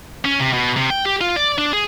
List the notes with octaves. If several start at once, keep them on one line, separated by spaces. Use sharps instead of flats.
C#4
C3
B2
C3
G5
G4
F4
D5
D4
G#4